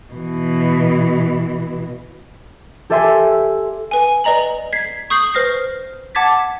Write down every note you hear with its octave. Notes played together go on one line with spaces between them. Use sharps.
B2 E3
G4 A4 D5 E5 G#5 C6
B4 G#5
B4 D5 D#5 A#5 F#7
G#6 B6 C7
C#6 D#6 G6 C7 F#7
B4 C5 F6 A#6 C7
F#5 A5 D6 G#6 A6 B6